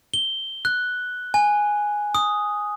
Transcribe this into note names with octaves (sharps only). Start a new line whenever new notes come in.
G7
F#6
G#5
D#6